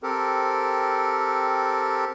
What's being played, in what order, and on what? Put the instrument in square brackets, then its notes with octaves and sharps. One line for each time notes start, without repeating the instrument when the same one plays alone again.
[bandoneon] C4 G4 A4 A#4